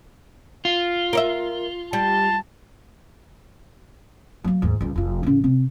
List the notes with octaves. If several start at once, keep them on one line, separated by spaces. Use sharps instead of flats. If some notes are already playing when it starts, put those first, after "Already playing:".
F4
A#4 C#5 E5
G3 A5
F#3 A#3
D#2 G#2
C#2 G3
F1 F4
A1 C#3
C3